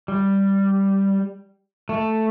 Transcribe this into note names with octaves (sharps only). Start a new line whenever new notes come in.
G3
A3